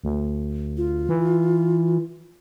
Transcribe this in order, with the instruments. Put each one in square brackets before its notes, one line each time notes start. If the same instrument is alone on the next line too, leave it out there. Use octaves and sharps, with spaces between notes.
[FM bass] D2
[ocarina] F4
[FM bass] E3